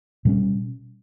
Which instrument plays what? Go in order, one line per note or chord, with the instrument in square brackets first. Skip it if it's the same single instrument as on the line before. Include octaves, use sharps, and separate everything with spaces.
[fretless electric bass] B2 G3 C#4